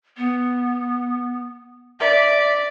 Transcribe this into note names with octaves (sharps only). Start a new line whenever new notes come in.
B3
D5 E5